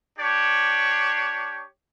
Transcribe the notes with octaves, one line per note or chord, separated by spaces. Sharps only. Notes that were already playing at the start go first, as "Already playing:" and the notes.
D4 G4 C#5